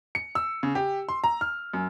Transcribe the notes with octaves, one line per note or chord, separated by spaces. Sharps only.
C#7
E6
C#3
G4
C6
A#5
F6
F#2